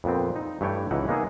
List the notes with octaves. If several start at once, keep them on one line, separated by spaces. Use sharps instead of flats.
F2 A#2 B3 C4
D#4
G2 E3 A3 B4 C#5 G5
C#2 E3 D#4 E4 F#5
G#3 A#3 B3 D#4 E4 G#4